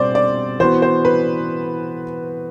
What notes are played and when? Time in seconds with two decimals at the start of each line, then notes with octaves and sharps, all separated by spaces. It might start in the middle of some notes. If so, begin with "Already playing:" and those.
Already playing: B2 G3 C4 C5 D5
0.15 D5
0.60 E3 B3 F#4 C5
0.82 C5
1.05 B4